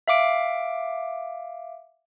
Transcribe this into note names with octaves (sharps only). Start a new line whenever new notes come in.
E5 F5 D6 D7